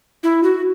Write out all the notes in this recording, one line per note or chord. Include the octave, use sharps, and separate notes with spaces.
E4
F#4